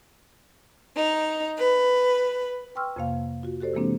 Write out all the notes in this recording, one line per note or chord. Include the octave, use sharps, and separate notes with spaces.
D#4
B4
B4 G5 C6 C#6 E6 F6
F2 C3 A#3 F5
F4 F#4
F#4 G4 A4 C5 D5
C3 E3 G#3 A#3 C4 D4